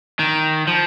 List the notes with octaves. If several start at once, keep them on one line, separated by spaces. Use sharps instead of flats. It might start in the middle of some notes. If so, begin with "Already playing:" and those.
D#3
F3